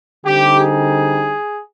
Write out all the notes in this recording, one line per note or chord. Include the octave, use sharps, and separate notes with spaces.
D3 G3 C4 D#4 G4
G#4